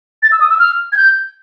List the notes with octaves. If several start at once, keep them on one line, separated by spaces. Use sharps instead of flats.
A6
E6
D#6
E6
F6
G#6
G6